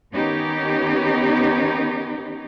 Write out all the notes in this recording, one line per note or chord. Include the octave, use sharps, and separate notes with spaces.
D#3 B3 C#4 D#4 G4